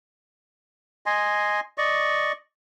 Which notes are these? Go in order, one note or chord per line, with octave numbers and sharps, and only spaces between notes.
D#5 G#5 C6
D5 D#5 C#6